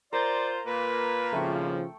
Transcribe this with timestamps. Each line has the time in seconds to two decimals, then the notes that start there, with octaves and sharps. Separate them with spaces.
0.13 F4 A#4 C5 D5
0.66 A#2 A#3 B4
1.33 G#1 C#3 F3 A3 G5 C#6